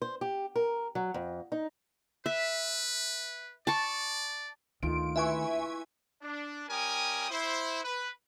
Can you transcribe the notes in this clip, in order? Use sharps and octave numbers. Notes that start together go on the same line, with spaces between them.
C5
G4
A#4
F#3
F2
D#4
B4 E5
D5 A5 C#6
D2 D#3 A3 F4 D7
E4 B4 E5 G#5 C#6
D4
G3 C#4 A#4 G5 G#5 D#6
E4 C5
B4